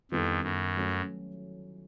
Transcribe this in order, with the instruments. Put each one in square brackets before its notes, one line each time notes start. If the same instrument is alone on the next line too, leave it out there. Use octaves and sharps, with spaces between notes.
[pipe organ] F2 [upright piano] D#3 G3 B3 E4 A4
[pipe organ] F#2
[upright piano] F#3 A3 C#4 F#4